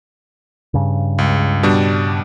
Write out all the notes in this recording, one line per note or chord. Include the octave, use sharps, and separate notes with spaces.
G2 C#3
C#2
B2 G3 D4